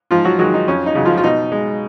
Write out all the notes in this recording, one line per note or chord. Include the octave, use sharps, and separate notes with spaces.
G#2 F3 F4
F#3 F#4
D#3 F#3 G#3 F#4
D#4
F2 C#4
D#4
C#3 F#3
F3 F4
F4
B2 D#4
G#3